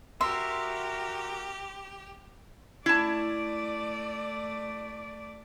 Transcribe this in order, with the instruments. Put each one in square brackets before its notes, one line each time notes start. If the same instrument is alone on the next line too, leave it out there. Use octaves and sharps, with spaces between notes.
[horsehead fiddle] F#4 A#4 [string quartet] G4 [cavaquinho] E5 [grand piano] C6
[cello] A3 D5 [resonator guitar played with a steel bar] E4 A5